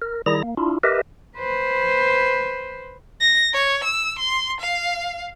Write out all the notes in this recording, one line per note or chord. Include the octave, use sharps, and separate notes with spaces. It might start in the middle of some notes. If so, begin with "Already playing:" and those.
A#4
D#3 G3 E4 G#4 A#5 A#6
A#3
D4 E4 F4
G4 A#4 B4 D#5 E5
B4 C5
A#6
C#5
E6
C6
F5